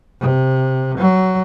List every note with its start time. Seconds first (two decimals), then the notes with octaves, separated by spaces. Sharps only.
0.21 C3
0.98 F#3